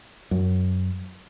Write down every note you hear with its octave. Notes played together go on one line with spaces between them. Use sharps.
F#2